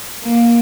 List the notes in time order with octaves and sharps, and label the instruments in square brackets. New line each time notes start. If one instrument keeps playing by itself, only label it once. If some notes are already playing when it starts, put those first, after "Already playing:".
[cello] A#3